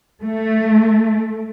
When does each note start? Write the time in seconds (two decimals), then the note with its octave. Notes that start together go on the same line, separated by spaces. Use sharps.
0.23 A3